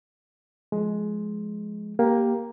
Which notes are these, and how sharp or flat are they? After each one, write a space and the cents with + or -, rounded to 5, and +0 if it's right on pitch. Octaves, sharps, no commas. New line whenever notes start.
F3 +0 G#3 +15
A#3 +5 G4 +0 G5 +0